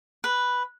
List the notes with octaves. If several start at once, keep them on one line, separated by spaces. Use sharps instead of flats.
B4